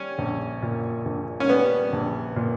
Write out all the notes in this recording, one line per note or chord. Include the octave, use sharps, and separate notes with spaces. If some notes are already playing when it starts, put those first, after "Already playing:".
Already playing: G3 C#4
A#1
A#2
A#1
C#4
G3 B3
A#1
A#2